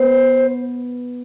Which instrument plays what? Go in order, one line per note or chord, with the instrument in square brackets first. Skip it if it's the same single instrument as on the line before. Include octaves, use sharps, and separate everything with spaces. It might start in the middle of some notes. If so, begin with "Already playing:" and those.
Already playing: [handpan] B3 [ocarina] C5